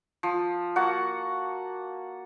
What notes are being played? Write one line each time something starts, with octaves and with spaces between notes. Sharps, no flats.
F3
A#3 F#4 F#5 A5